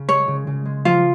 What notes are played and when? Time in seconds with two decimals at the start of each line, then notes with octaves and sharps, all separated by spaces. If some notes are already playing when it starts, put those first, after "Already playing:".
Already playing: C#3
0.08 G#3 C#5
0.28 C#3
0.47 C#3
0.65 G#3
0.85 F3 F4